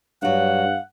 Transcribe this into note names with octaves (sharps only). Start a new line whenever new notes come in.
G2 F#3 D4 F5 F#5